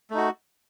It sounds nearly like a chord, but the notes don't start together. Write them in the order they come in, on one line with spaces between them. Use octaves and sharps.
A3 D#4 F#4